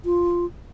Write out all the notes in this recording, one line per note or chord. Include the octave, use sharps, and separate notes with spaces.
F4